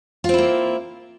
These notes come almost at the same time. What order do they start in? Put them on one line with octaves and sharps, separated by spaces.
F4 C4 E4 A#3